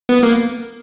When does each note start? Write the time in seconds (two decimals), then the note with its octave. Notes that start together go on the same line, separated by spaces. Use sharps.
0.09 B3
0.23 A#3